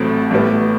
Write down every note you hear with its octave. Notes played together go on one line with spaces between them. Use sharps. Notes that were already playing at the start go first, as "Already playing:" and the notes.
Already playing: A1 A2 F#3 A3 C4
A1 A2 G3 B3